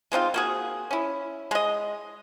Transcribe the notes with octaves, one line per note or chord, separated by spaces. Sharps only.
G#3 C4 D#4 F4
A#3 F#4 G#4
C#4 E4
G#3 D#5